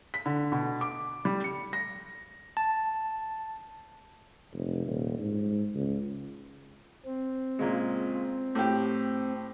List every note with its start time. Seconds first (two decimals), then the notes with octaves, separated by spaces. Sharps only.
0.14 B6
0.26 D3
0.52 B2
0.81 D6
1.25 G3
1.44 C#7
1.73 A#6
2.57 A5
4.53 F1
4.86 D#1
5.20 G#2
5.74 C#2
7.06 C4
7.59 A#2 C#3 G#3
8.55 A2 G4